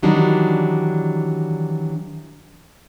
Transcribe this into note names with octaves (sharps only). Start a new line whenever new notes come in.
D#3 E3 F#3 G3 D4 D#4